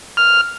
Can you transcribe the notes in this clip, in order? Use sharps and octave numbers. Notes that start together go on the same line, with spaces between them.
F6